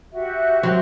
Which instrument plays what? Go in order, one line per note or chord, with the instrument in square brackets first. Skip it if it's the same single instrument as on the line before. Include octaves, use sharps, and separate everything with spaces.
[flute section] F#4 G4 E5
[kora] F#3 C4